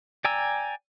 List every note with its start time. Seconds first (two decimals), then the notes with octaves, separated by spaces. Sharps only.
0.24 D5 G5 G#5 A#5 E6